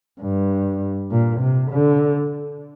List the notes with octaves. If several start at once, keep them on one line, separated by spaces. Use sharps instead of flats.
G2
A#2
C3
D3